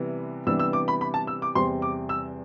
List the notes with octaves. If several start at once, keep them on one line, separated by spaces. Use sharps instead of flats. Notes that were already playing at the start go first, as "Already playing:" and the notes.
Already playing: C3 E3 G3 B3
C3 E3 G3 B3 D4 E6
E6
D6
B5
B5
A5
E6
D6
E2 C3 G3 C4 C6
D6
E6